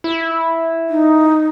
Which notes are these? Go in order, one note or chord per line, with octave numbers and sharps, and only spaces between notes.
E4
D#4